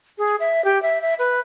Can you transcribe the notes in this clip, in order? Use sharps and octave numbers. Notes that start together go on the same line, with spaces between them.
G#4
E5
G4
E5
E5
B4